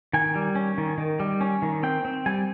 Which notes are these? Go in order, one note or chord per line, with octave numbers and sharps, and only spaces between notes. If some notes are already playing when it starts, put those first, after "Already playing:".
D#3 G#5
G3
C#4
D#3
D#3
G3
C#4
D#3
C4 G5
C4
G3 G#5